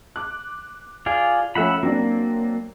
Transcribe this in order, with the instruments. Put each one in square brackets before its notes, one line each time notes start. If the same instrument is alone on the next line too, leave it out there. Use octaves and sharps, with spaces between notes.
[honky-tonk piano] D6 F#6
[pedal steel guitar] F4 G#4 D5
[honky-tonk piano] F3 A3 C#4 [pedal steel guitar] E5 F#5 B5
[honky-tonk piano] F#3 C4 D4 [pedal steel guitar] A#3